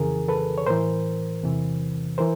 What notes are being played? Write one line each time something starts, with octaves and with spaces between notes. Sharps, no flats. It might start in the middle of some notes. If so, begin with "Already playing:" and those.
Already playing: F2 C#3 E3 G#4 A#4
A4 B4
C#5
A2 E3 A#4 C5
E2 C3 E3
E3 A#4 C5